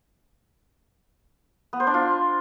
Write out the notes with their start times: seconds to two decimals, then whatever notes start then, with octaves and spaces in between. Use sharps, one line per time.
1.73 B3
1.80 C5
1.87 D4
1.94 F4